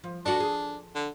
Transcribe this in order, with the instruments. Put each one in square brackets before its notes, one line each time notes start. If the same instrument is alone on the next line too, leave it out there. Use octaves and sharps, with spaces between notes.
[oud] F3
[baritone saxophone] D4 [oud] F#4 A4 D5
[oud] G#4
[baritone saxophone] D3